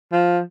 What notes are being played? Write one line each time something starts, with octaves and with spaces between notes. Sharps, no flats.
F3